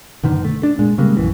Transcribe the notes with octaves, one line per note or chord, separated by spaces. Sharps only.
F#1 B2 D3 D#3
A3
D4
A#2 G#3
C#3 G3 G#3 A#3
A#1 F#2 E3